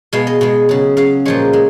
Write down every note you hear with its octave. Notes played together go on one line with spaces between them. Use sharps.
B2 G#3 F5
D#5
B2 G#3
C#3 F#3
C#3 F#3 F5
A#2 F3 G#3 C#5
G#3